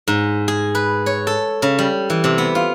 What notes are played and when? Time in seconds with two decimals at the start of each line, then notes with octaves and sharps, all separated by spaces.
0.08 G#2
0.48 G#4
0.75 B4
1.06 C#5
1.27 A4
1.62 C#3
1.79 G3
2.10 E3
2.24 C3
2.38 B3
2.55 F4